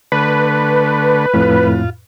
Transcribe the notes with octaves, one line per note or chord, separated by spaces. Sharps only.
D3 A3 B4
F2 A2 F4